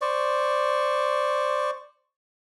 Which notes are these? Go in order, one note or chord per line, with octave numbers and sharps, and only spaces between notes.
C5 D5 C#6